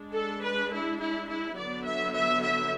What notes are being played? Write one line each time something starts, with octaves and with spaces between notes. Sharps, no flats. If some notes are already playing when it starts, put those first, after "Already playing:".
Already playing: G#3 D4
A4
B4
E4
E4
E4
D3 F#3 B3 D5
E5
E5
E5